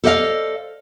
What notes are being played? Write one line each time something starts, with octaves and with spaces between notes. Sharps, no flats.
A4 C5 D5 D#5 F5